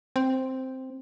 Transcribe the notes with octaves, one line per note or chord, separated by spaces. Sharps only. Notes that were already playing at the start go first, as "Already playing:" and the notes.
C4